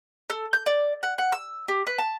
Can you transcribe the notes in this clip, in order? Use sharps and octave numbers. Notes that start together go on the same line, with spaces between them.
A4
G6
D5
F#5
F#5
E6
G4
B4
A5